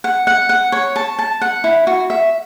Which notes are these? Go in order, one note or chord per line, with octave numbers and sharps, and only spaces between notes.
F#5
F#5
F#5
C#5
A5
A5
F#5
E4
F#4
E5